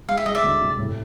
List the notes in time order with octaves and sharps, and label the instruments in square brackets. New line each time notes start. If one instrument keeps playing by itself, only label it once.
[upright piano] G#3 [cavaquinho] F5
[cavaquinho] E5
[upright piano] G#3 [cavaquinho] D#5
[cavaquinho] D5 E5
[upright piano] D2
C3
A2